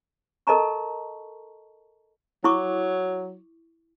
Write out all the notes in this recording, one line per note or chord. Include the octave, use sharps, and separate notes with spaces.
A4 A#4 D#5 A5 A#5 C#6
F#3 E4 C#6 D6